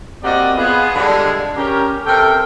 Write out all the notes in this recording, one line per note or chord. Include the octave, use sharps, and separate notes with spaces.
A#3 C4 F#4 G4 D5 D#5
B3 F4 G#4
D3 G3 G#3
C#4 G4 A#4
C3 A4 A#4 G5